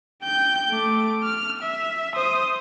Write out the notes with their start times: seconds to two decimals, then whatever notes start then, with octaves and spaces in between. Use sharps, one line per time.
0.23 G5 G6
0.71 A3 D6
1.24 F6
1.62 E5
2.15 C5 D#6